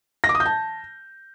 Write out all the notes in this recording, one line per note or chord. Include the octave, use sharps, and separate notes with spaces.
A#6
D6
D#6
G6
A5